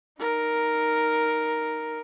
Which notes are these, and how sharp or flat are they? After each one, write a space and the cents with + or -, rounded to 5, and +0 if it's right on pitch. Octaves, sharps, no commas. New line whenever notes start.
D#4 +0 A#4 +0